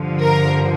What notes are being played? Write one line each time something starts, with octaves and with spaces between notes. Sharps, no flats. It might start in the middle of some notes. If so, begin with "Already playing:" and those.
Already playing: G2 D3 F3
A#4